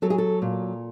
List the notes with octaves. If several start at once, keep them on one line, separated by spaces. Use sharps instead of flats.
F#3 A4
G#4
A4
A#2